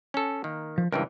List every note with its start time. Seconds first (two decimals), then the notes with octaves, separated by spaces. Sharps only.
0.14 C#4 A4
0.44 D#3 A#3
0.78 F3
0.92 C#2 G2 E3 A#4 G5